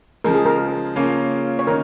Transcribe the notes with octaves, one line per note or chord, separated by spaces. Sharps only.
C#3 F3 G#3 A#4
G#4
A#4
C#3 A#3 C#4 F4
C#5
D#3 C#4 A#4